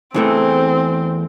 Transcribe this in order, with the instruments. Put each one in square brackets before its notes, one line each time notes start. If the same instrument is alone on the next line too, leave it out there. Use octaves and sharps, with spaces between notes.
[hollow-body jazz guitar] E2 E3 A3 [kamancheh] C4